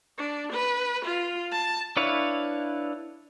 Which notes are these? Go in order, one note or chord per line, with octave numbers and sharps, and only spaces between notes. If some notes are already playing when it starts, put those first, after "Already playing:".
D4
B4
F4
A5
D4 E4 B4 C#5 F5